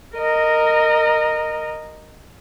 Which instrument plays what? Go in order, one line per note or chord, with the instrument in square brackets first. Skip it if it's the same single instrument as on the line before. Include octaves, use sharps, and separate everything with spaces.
[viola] A#4 D#5